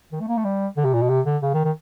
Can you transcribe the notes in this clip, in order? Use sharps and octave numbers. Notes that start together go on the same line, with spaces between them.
D#3
A3
A#3
A3
G3
D3
C3
A#2
B2
C3
D3
C#3
D#3
D#3